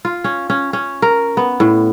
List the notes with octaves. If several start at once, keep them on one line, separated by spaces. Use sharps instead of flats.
F4
C#4
C#4
C#4
A#4
B3
A2